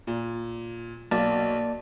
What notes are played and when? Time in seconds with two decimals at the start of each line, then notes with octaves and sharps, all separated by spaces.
0.07 A#2
1.11 B1 A#3 D5 A5